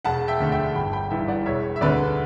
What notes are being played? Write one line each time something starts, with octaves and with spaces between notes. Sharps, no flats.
E1 F#5 A5
E5 G5
D2 D3 A3
E5 G5
G1 G5 B5
G5 B5
G2 E3 E5 G5
D5 F#5
E1 C#5 E5
E5
D2 D3 B4 D5